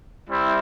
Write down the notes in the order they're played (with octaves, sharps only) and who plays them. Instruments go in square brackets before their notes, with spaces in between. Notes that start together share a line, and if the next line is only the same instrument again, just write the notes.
[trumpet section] G3 C4 E4